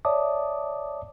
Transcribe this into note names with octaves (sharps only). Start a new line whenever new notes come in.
C#5 D5 E5 A5 D6 D#6